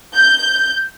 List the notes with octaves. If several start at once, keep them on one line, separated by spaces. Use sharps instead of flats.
G6